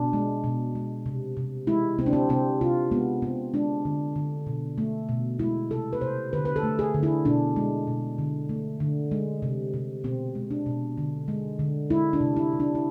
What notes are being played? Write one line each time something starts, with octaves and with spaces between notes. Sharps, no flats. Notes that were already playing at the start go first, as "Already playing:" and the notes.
Already playing: B2 D4
G#3
B2
G#3
C3
C3
G#3 E4
C3 C4
D4
C4
C3 C4
C3 F4
G#3 B3
C3 C4
G#3 D4
D3
D3
B2
A3
B2
G#3 E4
C3 A4
B4
C3 C5
D3 B4
B4
A4
A3
G#4
D3
E4
B2 D4
G#3
B2
D3
A3
D3
G#3
C3
C3
B2 C4
G#3
D4
B2
D3
G#3
D3
G#3 E4
D4
C3
E4
C3
D4
E4